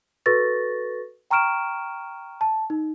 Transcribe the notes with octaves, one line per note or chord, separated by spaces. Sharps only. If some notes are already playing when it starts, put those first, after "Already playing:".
F#4 A4 B4 C#6 A6 A#6
G5 A#5 C#6 F6 D7 E7
A5
D#4